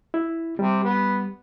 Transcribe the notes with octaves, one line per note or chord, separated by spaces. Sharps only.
E4
C3 G3
B3